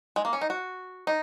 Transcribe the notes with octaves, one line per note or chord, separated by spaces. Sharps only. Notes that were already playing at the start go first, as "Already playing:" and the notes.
G#3
A#3
C#4
D#4
F#4
D#4